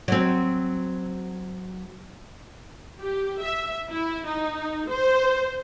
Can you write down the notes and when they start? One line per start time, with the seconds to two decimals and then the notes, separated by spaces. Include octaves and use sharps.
0.08 F#3 C4
3.00 G4
3.42 E5
3.90 E4
4.27 D#4
4.89 C5